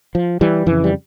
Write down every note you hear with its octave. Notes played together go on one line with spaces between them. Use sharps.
F3
E3 G3
F2 C#3 E3
G3